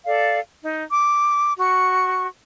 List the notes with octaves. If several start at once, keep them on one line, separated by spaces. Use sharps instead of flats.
A4 D5 F5
D#4
D6
F#4 C#6